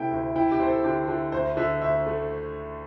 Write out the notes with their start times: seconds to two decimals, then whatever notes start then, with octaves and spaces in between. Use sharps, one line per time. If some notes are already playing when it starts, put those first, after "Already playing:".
Already playing: C3 A3 E4 G5
0.11 D2
0.36 E4 G5
0.51 G4
0.60 C4 C5
0.68 A4
0.84 D3 G4
1.08 D3
1.32 D2 C5
1.57 D3 E5
1.82 D2 E5
2.06 A3